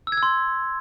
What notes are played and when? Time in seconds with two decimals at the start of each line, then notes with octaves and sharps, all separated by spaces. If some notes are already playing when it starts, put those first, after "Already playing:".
0.07 E6
0.12 G#6
0.17 E6
0.23 C6